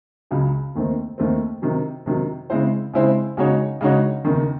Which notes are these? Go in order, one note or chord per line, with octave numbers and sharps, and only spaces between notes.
C#2 C#3 F#3
D#2 D#3 A3 C4
D#2 D#3 A3 C4
C3 D#3 F#3
C3 D#3 F#3
C#3 G#3 C4 E4 C5
C#3 G#3 C4 E4 C5
C#3 G#3 D#4 F#4 C#5
C#3 G#3 D#4 F#4 C#5
F#1 E2 D#3